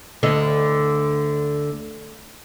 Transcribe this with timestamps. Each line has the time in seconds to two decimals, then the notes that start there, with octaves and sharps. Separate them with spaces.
0.23 D2 D3 D#5